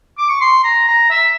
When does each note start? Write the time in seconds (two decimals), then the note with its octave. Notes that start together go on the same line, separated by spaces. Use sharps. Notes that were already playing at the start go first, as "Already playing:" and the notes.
0.18 D6
0.29 C#6
0.41 C6
0.64 A#5
0.88 A#5
1.10 E5